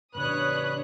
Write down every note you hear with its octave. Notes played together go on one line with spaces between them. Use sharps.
A2 C#3 D4 B4 C#5 D#6 F#6